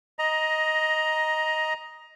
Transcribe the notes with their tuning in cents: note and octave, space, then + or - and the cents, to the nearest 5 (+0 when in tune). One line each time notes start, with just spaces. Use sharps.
D#5 +5 A#5 +15